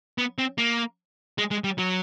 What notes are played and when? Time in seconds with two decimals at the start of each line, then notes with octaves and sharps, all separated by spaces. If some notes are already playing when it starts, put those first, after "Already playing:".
0.18 B3
0.38 C4
0.58 A#3
1.38 G#3
1.51 G#3
1.64 G3
1.78 F#3